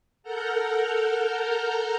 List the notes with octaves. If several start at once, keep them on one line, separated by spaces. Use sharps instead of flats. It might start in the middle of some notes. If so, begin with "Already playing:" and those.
A4 A#4 F#5 A#5 F6 G6